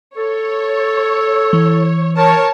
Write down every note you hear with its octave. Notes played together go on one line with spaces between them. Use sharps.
A4 C#5
E3
A#4 C#5 A5